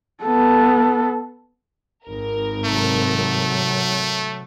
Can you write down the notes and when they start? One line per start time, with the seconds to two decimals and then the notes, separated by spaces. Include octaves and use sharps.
0.24 B3 A4
2.07 G#1 A#4
2.65 C3 F#3 A3